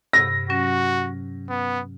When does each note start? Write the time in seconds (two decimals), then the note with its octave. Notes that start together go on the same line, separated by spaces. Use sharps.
0.13 G2 C3 A#6
0.50 F#3 C#4 F#4
1.49 B3